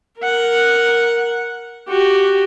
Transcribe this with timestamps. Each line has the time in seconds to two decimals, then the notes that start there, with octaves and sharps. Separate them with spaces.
0.19 A#4 F#5
1.88 F#4 G4